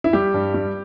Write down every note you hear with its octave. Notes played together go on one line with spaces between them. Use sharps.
E4
G3 G4
G2
G3